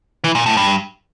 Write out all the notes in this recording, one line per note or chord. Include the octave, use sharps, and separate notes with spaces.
E3
A#2
A2
G2